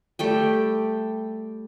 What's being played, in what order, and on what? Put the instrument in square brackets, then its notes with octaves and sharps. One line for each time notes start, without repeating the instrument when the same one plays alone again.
[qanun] G3 A3 G5